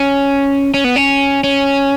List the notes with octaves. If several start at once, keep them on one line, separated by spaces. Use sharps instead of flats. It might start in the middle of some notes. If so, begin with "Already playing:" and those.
Already playing: C#4
C#4
B3
C#4
C#4